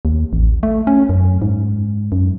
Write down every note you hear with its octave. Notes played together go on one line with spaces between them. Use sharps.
D#2
A1
A3
C#4
F#2
G#2
F#2